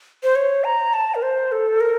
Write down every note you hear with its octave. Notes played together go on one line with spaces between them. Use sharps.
C5
C#5
A#5
A5
A#4
C5
A4
A#4